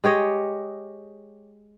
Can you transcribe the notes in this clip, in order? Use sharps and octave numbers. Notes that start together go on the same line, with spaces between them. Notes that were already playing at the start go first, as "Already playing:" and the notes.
G#3 G4 C#5 D#5